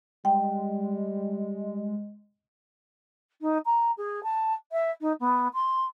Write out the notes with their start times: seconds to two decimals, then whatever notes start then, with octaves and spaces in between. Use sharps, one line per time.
0.25 G3 G#3 G5
3.41 D#4
3.65 A#5
3.97 G#4
4.23 A5
4.72 E5
5.01 D#4
5.20 B3
5.53 C6